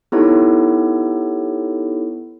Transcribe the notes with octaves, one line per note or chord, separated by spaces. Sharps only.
B3 D#4 E4 G4 A4 C#5